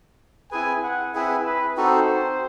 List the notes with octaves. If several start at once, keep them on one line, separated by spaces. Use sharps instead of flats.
C4 E4 G#4 B4 G#5
F#5
C4 E4 G#4 B4 E5
B4
C4 D#4 F#4 A4 C5